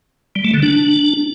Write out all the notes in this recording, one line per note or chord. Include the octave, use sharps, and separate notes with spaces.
G3
A3
D3
D4